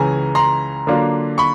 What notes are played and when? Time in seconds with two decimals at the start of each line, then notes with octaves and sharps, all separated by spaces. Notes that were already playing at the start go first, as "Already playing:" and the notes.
Already playing: C#2 C#3 E3 G#5 A#5
0.35 A#5 C6
0.87 D3 F#3 A#3 D4 F4
1.38 B5 C#6